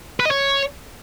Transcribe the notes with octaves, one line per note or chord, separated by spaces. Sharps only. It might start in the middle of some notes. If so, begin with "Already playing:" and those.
B4
D#5
C#5